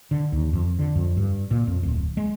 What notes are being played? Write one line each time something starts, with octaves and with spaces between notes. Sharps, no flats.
D3
D#2
F2
D3
F2
G2
A#2
F2
D1
G#3